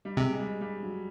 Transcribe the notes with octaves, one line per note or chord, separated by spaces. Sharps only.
G3
C3 G#3
G#3
G3
G3
F#3